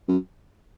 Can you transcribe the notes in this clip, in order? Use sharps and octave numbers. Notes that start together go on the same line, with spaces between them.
F#2